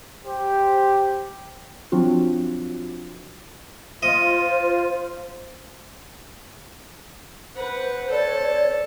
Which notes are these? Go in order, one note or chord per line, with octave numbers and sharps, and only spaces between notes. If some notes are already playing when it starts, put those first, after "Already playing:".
G4 C5
F3 F#3 C4 D4 F4 F#4
F4 C5 D#5
B4 C5 F#5
A4 C#5 D5 A5